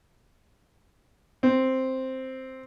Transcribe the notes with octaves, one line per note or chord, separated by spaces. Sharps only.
C4